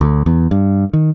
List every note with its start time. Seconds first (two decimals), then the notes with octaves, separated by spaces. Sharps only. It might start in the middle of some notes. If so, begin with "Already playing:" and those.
0.01 D2
0.26 E2
0.51 G2
0.93 D#3